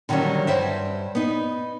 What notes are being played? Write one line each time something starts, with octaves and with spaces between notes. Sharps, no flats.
D3 D#3 F#3 G3 C#4
G2 C5 E5
B3 D#4